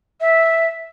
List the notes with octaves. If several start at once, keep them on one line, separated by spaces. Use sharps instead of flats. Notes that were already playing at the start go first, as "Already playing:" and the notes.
E5